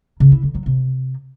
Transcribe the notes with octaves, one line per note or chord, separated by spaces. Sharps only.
C#3
E4
D3
F#3
C3